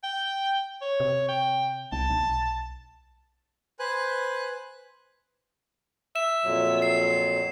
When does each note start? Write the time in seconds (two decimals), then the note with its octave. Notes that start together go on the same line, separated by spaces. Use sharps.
0.04 G5
0.81 C#5
1.00 C3
1.28 G5
1.92 C2 A5
2.10 B1
3.79 B4 C5 G#5 F#6
6.16 E5 E7
6.44 F2 A#2 F#3
6.82 C7